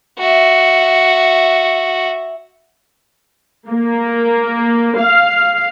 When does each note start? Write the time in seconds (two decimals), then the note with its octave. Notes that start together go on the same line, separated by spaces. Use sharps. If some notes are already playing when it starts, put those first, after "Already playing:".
0.18 F#4 E5
3.69 A#3
4.98 F5